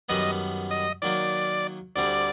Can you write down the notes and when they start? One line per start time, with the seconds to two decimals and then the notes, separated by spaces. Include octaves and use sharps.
0.09 F#2 D#3 G3 B3 D#4 D#5
0.71 D#5
1.02 D#3 F#3 A#3 D5
1.96 D2 D3 G3 C4 D5